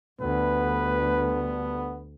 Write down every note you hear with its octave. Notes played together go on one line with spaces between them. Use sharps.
D2 D3 G3 B3 B4